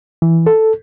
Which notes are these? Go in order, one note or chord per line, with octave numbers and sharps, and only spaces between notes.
E3
A4